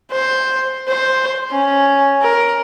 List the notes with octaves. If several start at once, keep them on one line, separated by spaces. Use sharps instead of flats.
C5
C5
C#4
A#4